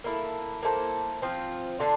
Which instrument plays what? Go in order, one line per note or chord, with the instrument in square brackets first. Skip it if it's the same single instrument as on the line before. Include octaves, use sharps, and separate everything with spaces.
[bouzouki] A#3 E4 A4
A#3 E4 A4 C5
F3 C4 F4
D3 D4 F4